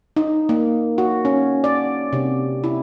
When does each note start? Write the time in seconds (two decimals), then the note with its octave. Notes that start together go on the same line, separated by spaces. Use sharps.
0.16 D#4
0.49 A#3
0.98 F#4
1.25 C#4
1.64 D5
2.13 C3
2.64 E4